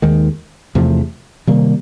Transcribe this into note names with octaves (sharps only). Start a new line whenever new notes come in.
D#2 D#3 G#3
E2 C3 F3 A3
C3 D#3 G3 A#3